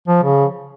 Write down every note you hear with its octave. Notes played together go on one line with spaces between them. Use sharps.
F3
C#3